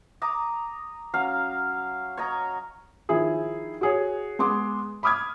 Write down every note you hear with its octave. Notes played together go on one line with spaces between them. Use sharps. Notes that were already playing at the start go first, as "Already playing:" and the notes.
A#5 D6 D#6
F#3 C#4 F5
C#5 D#5 A#5
D#3 F3 E4 G#4
F#4 G#4 C#5
G#3 B3 C6 D6
B5 D6 D#6 F6 G#6